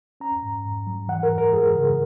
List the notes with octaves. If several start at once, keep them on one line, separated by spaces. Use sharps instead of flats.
C#4 A#5
G#2
G#2
F#3
E3 F#5
A#4
F#2
A#4
G#3 G#4
C#3